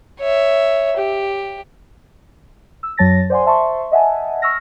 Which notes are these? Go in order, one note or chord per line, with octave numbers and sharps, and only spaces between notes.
C#5 E5
G4
E6
F#2 F#3 C#5 A5 A6 A#6
C5 D5 F#5 G#5 C6
C5 E5 A5 C6 C#6
D#5 E5 F#5 G#5 A5
C#6 E6 F6 A#6